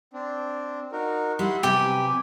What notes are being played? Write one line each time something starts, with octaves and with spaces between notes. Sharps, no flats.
C4 D4
D#4 F#4 A#4
G3 E4 F#5 C6
C3 F#3 G4 B4 G#5